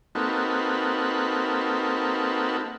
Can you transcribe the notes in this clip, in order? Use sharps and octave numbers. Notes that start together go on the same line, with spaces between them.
A#3 C4 D#4 F#4 A4 B4